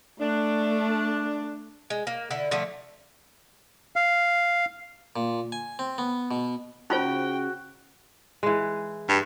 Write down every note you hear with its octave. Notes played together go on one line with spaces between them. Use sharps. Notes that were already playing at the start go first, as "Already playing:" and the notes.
A3 D4
G#3
A#3
D3 E4
D3 F3 A3
F5
A#2
G#5
C4
B3
B2
C#3 D#4 F4 F#4 C5 G5
E3 G#3
G2